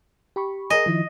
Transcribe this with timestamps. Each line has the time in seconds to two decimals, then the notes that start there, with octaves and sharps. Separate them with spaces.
0.36 G4 B5 C#6
0.70 G#4 A#4 D#5 G#5
0.86 D#3 F3 E4